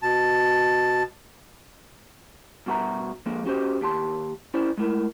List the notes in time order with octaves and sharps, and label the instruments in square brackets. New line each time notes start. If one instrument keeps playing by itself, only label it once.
[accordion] B2 A5
[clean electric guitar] G2 B2 F#4 A4 E5 A#5
D3 F3 G#3 A#3
C#4 F#4 G4 C5 D#5
D#2 G4 A5 C6
C#4 E4 C5 D5
G#3 A3 E4 A#4